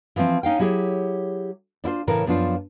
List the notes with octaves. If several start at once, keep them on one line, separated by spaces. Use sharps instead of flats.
E3 F3 A#3 C4
C#4 D#4 F5 G5
F#3 E4 G4 G#4 C#5
D4 E4 F4 C5
A2 C#3 E3 A#4
F#2 F3 B3 C#4 D4 F4